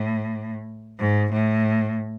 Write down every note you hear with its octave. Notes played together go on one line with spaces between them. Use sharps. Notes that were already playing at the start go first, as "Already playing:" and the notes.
Already playing: A2
G#2
A2